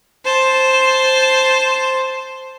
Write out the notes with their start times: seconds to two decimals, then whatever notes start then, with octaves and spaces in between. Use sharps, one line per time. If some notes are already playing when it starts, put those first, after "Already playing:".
0.25 C5 A5